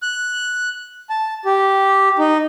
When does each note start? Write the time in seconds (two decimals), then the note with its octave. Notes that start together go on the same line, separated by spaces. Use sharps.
0.02 F#6
1.10 A5
1.45 G4
2.19 D#4